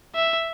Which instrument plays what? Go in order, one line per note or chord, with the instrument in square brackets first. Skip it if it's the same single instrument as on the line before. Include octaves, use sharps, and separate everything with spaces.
[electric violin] E5